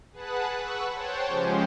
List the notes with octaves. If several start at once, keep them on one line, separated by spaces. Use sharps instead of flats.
G#4 B4 F#5 A5 F#6
B4 F#5 C#6 E6 F#6
C5 C#5 F#5 G5 A5
C#3 F3 G#3 C#4 G4 C5